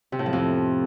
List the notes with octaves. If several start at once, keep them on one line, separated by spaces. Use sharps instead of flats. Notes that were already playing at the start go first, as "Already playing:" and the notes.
C3
A2
F3
F2